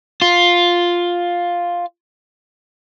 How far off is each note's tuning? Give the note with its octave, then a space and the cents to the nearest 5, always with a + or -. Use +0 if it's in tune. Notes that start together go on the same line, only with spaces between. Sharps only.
F4 +5